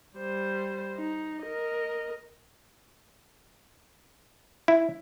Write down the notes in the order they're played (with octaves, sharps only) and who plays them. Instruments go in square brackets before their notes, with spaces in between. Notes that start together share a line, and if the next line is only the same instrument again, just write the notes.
[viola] G3 C5
D#4
A#4 D#5
[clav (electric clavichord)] E4